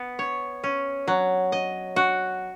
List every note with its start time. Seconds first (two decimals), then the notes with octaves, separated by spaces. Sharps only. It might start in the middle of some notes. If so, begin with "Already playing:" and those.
Already playing: B3
0.19 C#5
0.64 C#4
1.08 F#3
1.52 D#5
1.96 F#4